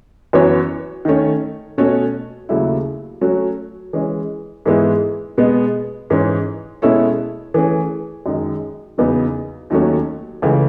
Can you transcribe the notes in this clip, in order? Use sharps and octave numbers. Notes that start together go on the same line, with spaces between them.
F#2 E3 B3 F#4 C#5
D#3 A3 C#4
B2 A3 C#4 F#4 A4
D#2 C#3 F#3 A3 E4
F#3 A3 C#4 F#4
E3 G#3 C#4
G#2 E3 G#3 B3 E4
B2 G#3 B3
G#2 E3 G#3 C#4
B2 G#3 C#4 E4 A4
E3 A3 C#4 G#4
F#2 D#3 G#3
E2 C#3 F#3 B3 D#4
D#2 D#3 F#3 A3 C#4
C#2 C#3 E3 A3